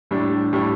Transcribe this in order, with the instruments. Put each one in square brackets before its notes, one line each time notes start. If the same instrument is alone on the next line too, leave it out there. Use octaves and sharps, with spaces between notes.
[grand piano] A2 G3 D4
A2 G3 D4